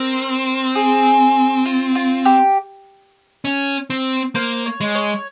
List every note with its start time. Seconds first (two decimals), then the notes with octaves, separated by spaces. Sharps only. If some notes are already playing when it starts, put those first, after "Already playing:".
Already playing: C4 A#4
0.75 G#4
1.65 F4
1.95 F4
2.25 G4
3.45 C#4
3.90 C4
4.35 A#3 C5
4.66 C#5
4.81 G#3
4.95 C#5